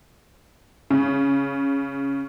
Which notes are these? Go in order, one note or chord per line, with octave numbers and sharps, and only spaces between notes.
C#3